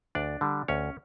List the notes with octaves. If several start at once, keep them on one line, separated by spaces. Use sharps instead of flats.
D2 D4 D5
D3 G3
D2 C#4 C#5